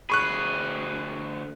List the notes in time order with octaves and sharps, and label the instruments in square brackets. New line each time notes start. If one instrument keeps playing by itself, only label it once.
[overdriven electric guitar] D2 G#4 [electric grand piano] B5 C#6 F#6